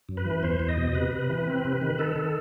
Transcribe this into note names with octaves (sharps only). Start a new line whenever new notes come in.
F#2
B4
E3
E2 C5
E2
D#5
B2
C3 B4
C3
E3
C4
C3
D#3
D#3 A4
D#3